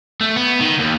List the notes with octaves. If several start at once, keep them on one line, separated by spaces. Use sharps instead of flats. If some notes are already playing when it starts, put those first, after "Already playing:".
A3
B3
D#3
D#2